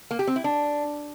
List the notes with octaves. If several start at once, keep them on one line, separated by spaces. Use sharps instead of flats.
A#3
G4
C4
E4
D4